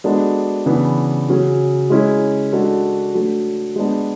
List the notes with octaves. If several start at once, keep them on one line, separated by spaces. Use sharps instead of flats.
G#3 B3 D4 F#4 A4
C#3 E3 B3 D4
C#3 F#3 C#4 G#4
G#3 C#4 E4 G#4
G#3 D4 F#4 A4
F#3 A3 D4
G#3 B3 D4